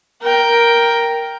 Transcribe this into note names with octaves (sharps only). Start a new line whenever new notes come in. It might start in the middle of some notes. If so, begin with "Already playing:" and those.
A#4 G5